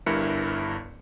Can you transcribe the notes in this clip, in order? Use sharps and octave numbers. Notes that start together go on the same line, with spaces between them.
G1 G2 E4 A#4 C#7